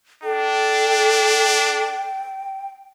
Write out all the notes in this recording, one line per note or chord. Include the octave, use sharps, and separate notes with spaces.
D4 A4 G5